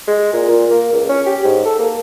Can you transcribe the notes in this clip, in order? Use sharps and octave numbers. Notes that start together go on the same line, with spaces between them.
G#3
A#2
A#2
A#3
C#2
C#4
G4
G#2
A4
A#3